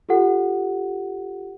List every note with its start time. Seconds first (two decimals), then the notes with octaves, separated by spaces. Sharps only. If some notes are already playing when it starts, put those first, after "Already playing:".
0.09 F4 G4 A4 F#5